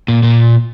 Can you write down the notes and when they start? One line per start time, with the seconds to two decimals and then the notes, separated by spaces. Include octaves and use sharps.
0.08 A#2
0.23 A#2